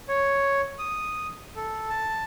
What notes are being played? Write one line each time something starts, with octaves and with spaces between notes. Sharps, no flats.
C#5
D#6
A4
A5